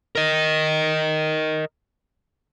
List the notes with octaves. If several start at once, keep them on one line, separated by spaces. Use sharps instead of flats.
A#4 D#5